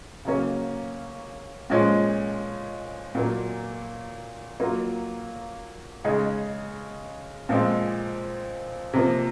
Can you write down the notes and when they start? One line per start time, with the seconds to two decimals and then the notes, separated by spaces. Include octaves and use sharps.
0.25 C#3 F#3 A#3 C#4
1.70 A#2 F3 G#3 C#4
3.15 A#2 F#3 A#3
4.60 F#3 A#3 F4
6.04 C#3 G#3 D#4 G#4
7.49 A#2 F3 G#3 C4
8.93 C3 F3 A#3